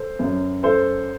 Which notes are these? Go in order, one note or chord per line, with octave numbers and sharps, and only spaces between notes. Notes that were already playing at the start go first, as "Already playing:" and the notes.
Already playing: A4 C5
F#2 F#3
A4 C5